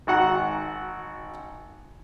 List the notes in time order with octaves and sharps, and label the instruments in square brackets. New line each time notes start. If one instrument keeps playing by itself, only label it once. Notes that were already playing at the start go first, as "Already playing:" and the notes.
[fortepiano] G#1 F#4 F#5 A#5